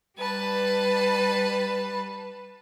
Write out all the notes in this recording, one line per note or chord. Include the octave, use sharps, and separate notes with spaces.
G3 B4 A5